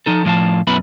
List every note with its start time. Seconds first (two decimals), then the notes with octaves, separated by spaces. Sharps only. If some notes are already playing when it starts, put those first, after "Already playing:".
0.06 F3 D#4 A4
0.25 A2 F3 F5 A5
0.67 F#2 B2 B3 E4 B5